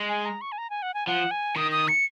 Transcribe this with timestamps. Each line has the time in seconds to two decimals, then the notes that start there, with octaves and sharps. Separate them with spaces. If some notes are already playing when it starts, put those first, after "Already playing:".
Already playing: G#3
0.09 G#5
0.25 A#5
0.41 C#6
0.52 G#5
0.58 A#5
0.70 G#5
0.82 F#5
0.94 G#5
1.07 F3 F#5
1.31 G#5
1.56 D#3 D#6
1.72 D#6
1.88 C#7